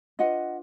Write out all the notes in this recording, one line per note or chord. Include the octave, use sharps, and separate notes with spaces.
D4 F4 B4 D#5 F#5